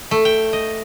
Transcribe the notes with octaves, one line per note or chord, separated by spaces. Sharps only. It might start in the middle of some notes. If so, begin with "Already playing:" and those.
A3
G5
D#5